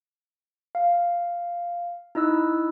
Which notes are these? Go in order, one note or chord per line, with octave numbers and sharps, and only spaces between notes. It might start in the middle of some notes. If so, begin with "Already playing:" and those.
F5
D#4 E4 D#5 E6 F#6